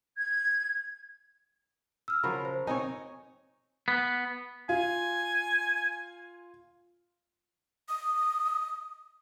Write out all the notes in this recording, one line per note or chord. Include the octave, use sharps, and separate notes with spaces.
G#6
E6 F6
C#3 F3 F#3 A#4 B5
C5
B2 C4 D#4 C#5 G#5
B3
F4 G#5
D#6